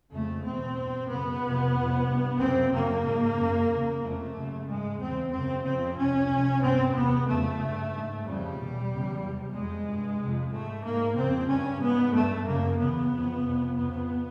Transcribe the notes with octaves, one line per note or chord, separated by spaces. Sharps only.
F2 C#3 A3
E2 B2 C4
G2
F#2 C#3 B3
F2 C3
F2 C3
G2
F#2 C#3 C4
F#2 C#3 A#3
G#2
F#2 C#3
E2 C#3
F2 C#3 A3
F#2 C#3
G#2 G#3
E2 C#3 C4
F#2 C#3 C4
F2 C#3 C4
F2 C3 C#4
F2 C3
G2 C4
E2 C3 B3
F2 C#3 A3
G2
G#2
F2 C#3 G3
E2 B2
E2 C#3
E2 C3
F2 C3 G#3
G2
F2 C3
G#2 A3
G#2 A#3
F2 C#3 C4
G2 C#4
G#2 B3
G2 A3
F#2 C#3 A#3
E2 C#3 B3
F2 C#3
F2 C3
F2 C#3 B3